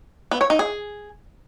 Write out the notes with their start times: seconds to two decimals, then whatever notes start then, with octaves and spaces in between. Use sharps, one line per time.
0.31 B3
0.41 C#5
0.50 D#4
0.59 G#4